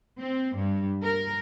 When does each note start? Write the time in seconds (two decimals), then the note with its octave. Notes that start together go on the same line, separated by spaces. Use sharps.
0.18 C4
0.55 G2
1.03 A#4